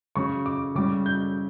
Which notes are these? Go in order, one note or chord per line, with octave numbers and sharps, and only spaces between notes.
C#3 F#3 C#4 C#6
D6
C#3 G3 C#4 D6
G6